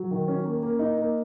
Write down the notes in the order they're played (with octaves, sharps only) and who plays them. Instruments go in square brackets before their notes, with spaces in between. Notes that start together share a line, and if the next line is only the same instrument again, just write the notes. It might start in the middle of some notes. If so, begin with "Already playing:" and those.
Already playing: [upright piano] F#3
D#3
C#4
A#3
A#3
D#4
A#3